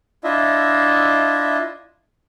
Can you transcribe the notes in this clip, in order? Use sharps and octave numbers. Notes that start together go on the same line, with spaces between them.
D4 E4 F4 D#5 E5